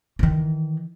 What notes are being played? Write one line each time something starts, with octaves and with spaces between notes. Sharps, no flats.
D#3 E3